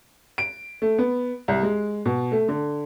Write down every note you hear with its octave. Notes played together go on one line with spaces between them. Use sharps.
D7
A3
B3
C2
G#3
B2
A3
D3